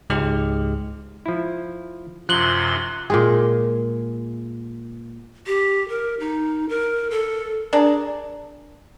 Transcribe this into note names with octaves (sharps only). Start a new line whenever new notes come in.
C#2 G#2 G#3 G4 F6
F3 E4
F#2 C3 F3 C6 F#6 F#7 G7
A#2 G#3 G#4
G4
A#4
D#4
A#4
A4
D4 G#4 A#4 D5